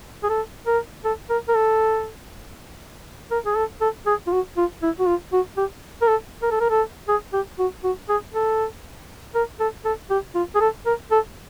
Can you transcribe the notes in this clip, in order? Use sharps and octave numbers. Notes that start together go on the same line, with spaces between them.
G#4
A4
A#4
A4
A#4
A#4
A4
A#4
G#4
A4
A4
G#4
F4
F#4
F4
E4
F#4
F4
F#4
G4
A#4
A4
A#4
A4
A#4
A4
G#4
G4
F#4
F#4
G#4
A4
A#4
A4
A4
G4
F4
G#4
A4
A#4
A4